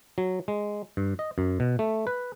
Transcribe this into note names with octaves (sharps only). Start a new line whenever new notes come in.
F#3
G#3
G2
D#5
F#2
B2
A3
B4